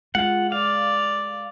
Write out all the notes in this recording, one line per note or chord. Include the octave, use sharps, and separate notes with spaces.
G#3 F4 F#5
D5 F5